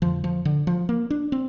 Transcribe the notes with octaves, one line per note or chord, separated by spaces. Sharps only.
F2 D3 F3
F3
D3
F3
A#3
D4
C4